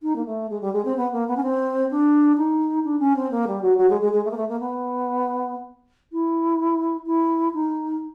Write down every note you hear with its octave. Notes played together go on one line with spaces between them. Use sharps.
D#4
A#3
A3
G#3
G3
G#3
C4
B3
A#3
B3
C#4
C4
D4
D#4
D4
C#4
C4
A#3
G3
F#3
F#3
G#3
G#3
G#3
A3
A#3
A3
A#3
B3
E4
E4
D#4